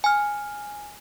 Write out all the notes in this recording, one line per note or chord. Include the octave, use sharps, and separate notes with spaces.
G#5 F6